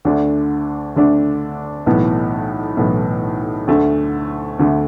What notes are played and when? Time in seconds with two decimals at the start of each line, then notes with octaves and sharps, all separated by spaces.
0.05 D2 D3 A3 D4
0.96 D2 D3 A3 D4
1.86 B1 A2 E3 B3
2.77 B1 A2 E3 B3
3.67 D2 D3 A3
4.59 D2 D3 A3